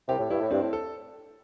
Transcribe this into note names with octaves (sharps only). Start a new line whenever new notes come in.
C2 C3 G4
A2
G2 E4
A2
G2 C4
A2
A4